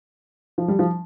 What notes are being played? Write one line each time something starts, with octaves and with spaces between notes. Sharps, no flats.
F3
G3
F3